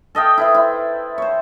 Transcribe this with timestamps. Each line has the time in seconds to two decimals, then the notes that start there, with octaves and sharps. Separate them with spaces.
0.15 A4 D#5 F5 G5
0.37 E4 B4 C5
0.54 E4
1.18 C5 C#5